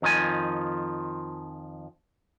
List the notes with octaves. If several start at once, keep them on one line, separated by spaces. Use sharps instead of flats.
F2 D#3 F3 G#5